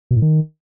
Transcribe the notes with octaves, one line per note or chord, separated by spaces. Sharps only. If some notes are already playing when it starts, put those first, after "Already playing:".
B2
A2
D#3